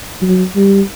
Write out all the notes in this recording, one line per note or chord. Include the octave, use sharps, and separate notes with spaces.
F#3
G3